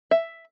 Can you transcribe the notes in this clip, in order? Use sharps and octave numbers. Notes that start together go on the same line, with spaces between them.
E5